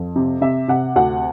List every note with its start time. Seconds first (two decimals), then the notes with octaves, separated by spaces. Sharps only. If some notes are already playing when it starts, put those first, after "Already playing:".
Already playing: F2
0.16 C3
0.41 C3 E5
0.68 C3 F#5
0.96 D2 F#5